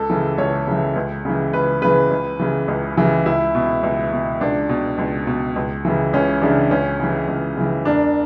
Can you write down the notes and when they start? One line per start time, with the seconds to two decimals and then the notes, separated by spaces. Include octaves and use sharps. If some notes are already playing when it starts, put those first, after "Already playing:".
Already playing: C#2 A4
0.10 C#3 E3
0.38 C#2 C#5
0.67 C#3 E3
0.96 C#2
1.25 C#3 E3
1.53 C#2 B4
1.82 C#3 E3 B4
2.10 C#2
2.39 C#3 E3
2.68 C#2
2.97 C#3 E3
3.26 C#2 E4
3.55 B2
3.83 C#2
4.12 B2
4.41 C#2 D4
4.69 B2
4.98 C#2
5.27 B2
5.56 C#2
5.85 C#3 E3
6.13 C#2 C#4
6.42 C#3 E3 D4
6.71 C#2 C#4
7.00 C#3 E3
7.28 C#2
7.57 C#3 E3
7.85 E1 D4